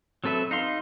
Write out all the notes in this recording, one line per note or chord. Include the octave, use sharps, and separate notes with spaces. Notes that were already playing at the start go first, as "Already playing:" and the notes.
F#3 C4 A4 B4 E5
D#4 F5 C6